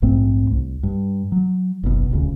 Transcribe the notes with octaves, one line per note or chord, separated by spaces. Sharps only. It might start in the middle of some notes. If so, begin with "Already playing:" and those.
A#1 G#2 A3 C4
C2
G2
F#3
F#1 B1 B2
D#1 D2 C#3